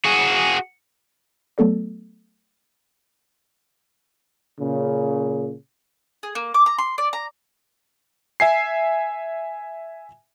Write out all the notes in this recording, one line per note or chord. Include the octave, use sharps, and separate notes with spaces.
F#4 G#4
F#3 A3 B3 A4 D5
A#2 C#3
G#4
A#3
D6
A#5
C6
D5
A#5
E5 G#5 C7